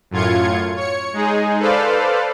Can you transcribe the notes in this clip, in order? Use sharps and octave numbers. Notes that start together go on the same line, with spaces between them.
F#2 A2 F4 G#6 C#7
C#5 C#7
G#3 D#4 G#4
A4 B4 C5 D5 F5